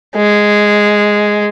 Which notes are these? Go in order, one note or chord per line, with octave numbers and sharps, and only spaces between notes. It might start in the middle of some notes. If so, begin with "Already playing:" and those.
G#3